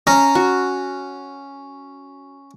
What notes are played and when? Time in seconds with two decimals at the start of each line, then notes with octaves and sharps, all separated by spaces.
0.07 C#4 A#5
0.35 F#4